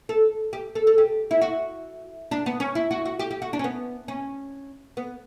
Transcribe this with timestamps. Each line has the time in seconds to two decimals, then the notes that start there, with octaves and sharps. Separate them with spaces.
0.09 A4
0.53 G4
0.75 A4
0.87 A4
0.98 G4
1.31 E4
1.41 F#4
2.31 D4
2.46 B3
2.60 C#4
2.75 E4
2.91 F#4
3.05 F#4
3.19 G4
3.31 G4
3.42 F#4
3.53 D4
3.59 C#4
3.64 B3
4.08 C#4
4.97 B3